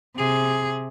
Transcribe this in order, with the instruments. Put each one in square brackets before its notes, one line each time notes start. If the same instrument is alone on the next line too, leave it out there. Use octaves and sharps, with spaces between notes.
[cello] C3 G#4